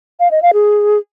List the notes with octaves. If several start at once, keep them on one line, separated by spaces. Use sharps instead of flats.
F5
D#5
F5
G#4